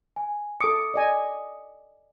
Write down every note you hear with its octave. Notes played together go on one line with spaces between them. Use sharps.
G#5
A4 D6 D#6 C#7
D5 D#5 G#5